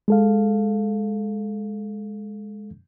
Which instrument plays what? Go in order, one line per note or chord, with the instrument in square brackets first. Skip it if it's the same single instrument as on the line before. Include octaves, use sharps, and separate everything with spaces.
[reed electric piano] G#3 A4 F5